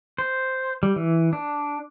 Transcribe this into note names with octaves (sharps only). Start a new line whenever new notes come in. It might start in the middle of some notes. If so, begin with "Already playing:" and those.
C5
G3
E3
D4